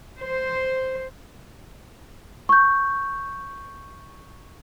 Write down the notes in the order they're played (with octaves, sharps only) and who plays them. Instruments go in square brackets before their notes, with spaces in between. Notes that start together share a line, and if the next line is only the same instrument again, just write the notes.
[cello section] C5
[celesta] C#6 G6